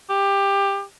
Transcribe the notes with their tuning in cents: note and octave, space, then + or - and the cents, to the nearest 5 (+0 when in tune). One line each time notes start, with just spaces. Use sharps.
G4 +20